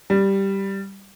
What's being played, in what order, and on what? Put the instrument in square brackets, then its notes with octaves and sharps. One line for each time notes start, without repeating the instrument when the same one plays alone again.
[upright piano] G3